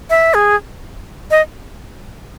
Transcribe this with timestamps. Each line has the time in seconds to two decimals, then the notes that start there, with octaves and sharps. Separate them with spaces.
0.10 E5
0.34 G#4
1.31 D#5